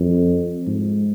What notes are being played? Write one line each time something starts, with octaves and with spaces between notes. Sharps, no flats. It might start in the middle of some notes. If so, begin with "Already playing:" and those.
Already playing: F2
G#2